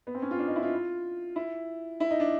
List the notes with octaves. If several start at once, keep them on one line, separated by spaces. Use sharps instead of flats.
B3
C4
C#4
F4
D4
D#4
E4
F4
E4
E4
D#4
D4